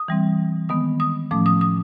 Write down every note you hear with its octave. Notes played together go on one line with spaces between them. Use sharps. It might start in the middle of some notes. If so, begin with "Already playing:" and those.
Already playing: D#6
E3 G3 C4
D#3 G#3 B3 D#6
D#6
A2 F3 A3 C#4 D6
D#6
D#6